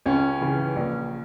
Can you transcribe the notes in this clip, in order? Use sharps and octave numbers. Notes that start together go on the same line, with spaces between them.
C#2 C#4
C#3 E3
A#1